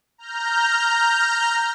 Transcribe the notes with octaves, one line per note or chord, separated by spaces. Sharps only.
A#5 F6 G6